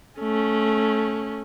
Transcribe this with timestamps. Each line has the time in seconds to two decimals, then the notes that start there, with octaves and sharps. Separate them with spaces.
0.19 A3 C#4